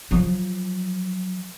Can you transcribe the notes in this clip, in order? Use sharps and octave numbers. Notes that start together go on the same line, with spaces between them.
F3 F#3